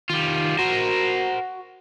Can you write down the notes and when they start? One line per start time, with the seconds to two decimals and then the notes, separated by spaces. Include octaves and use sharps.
0.09 D#3 G3 F4
0.59 F#4 A#4 C5